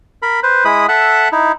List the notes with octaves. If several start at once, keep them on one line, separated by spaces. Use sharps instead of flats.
A#4 B5
B4 C5
G#3 E4 B5 D#6
A4 E5 F#5 F#6
D#4 E4